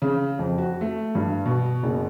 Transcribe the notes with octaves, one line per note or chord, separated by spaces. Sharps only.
C#3
F2
F#4
A3
G2
B2
F#1